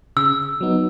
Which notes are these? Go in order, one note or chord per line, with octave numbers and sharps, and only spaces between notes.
C#3 E6
F#3 B3 D#4